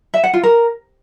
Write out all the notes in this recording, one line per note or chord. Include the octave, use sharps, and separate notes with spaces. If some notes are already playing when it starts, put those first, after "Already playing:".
E5
F#5
F4
A#4